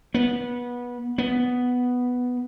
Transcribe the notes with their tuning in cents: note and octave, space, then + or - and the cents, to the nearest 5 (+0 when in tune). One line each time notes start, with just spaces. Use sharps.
B3 -20
B3 +0